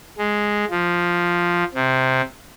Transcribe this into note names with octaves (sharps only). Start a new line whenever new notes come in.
G#3
F3
C3